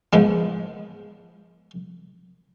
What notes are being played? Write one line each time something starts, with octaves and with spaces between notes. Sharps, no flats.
G#2 F3 B3